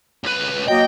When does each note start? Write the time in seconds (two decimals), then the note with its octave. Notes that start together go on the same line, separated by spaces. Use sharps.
0.24 C#2 B4
0.68 F#3 A#3 D#5 G5